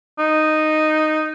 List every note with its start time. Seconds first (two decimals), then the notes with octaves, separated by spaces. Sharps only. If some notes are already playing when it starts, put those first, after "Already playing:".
0.19 D#4